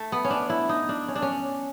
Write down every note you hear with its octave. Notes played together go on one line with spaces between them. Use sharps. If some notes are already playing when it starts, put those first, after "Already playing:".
Already playing: A3
B3
C#4
D4
E4
D#4
D4
C#4
D4
C#4